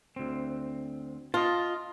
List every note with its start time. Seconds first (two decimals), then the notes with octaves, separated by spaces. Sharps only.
0.16 D2 C4
1.34 F4 D#5 F5 A5